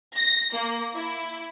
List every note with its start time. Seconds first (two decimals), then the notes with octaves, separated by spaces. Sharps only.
0.16 A#6
0.55 A#3
0.95 E4